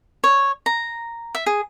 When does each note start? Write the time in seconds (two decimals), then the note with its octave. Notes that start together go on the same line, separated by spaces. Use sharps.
0.24 C#5
0.66 A#5
1.35 E5
1.46 G#4